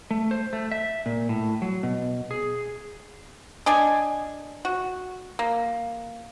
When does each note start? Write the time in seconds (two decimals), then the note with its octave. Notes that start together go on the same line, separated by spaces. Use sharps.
0.11 A3
0.31 C5
0.53 A3
0.72 E5
1.06 A#2
1.29 A2
1.62 F#3
1.83 B2
2.31 G#4
3.66 D4 D#5 G#5
4.65 F#4
5.39 A#3